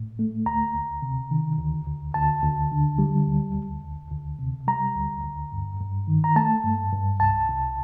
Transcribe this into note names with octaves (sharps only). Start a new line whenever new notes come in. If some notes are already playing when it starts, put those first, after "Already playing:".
Already playing: A2
A3
D2 A#5
D2
C3
D#3
D2
D2
D2 A5
D2
D3
G3
D2
D2
D2
D2
C3
G3 A#5
D2
D2
G2
G2
D#3
A#5
A3 A5
G2
G2
C2 A5
C2